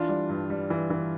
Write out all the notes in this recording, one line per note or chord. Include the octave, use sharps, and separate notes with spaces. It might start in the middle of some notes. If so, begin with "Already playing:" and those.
Already playing: E3 D4 F4
G3
G2
G3
E3
E3